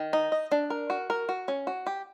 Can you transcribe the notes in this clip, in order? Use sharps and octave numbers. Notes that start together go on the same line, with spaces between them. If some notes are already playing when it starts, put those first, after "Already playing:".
Already playing: D#3
D#4
D#5
D4
A#4
F#4
A#4
F#4
C#4
F#4
G4